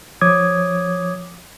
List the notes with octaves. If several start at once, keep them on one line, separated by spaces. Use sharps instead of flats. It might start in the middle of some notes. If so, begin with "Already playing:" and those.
F3 C#5 D6 D#6 G#6